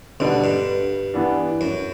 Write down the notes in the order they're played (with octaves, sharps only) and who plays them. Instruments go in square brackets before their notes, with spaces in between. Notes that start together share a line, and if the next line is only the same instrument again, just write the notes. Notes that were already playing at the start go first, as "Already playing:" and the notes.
[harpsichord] B1 B2 [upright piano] D3 G3 B3 D4
[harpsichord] G2
[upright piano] E3 B3 D4
[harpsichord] F#2